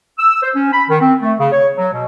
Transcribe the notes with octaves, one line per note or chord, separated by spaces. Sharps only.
E6
C5
C#4
B5
D#3
C4
A3
C#3
C#5
F#3
B2